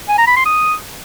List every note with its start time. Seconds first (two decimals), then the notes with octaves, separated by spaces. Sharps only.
0.09 G#5
0.18 A#5
0.27 B5
0.36 C6
0.46 D#6